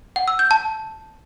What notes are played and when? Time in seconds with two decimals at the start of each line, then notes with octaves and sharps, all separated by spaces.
0.16 F#5
0.28 E6
0.39 G6
0.51 A5